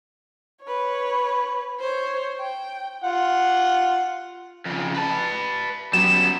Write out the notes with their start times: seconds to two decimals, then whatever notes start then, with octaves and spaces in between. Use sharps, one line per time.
0.63 B4 C#5
1.79 C5 C#5
2.39 G5
3.04 F4 F#5
4.66 F2 C#3
4.95 B4 A5
5.93 F#3 G3 B3 C#4 E7